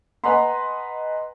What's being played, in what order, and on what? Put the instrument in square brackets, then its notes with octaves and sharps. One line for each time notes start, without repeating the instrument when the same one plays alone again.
[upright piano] B4 D#5 F#5 G#5 A#5 C6